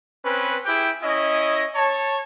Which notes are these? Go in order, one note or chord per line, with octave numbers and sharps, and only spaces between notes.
C4 C#4 B4
E4 G4 G#4 G5
C#4 E4 D#5
C#5 A5